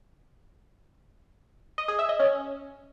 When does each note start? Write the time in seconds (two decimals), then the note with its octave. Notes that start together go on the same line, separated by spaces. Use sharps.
1.78 D#5
1.88 G#4
1.99 E5
2.09 D#5
2.19 C#4